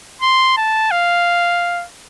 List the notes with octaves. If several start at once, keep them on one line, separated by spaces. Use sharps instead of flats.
C6
A5
F5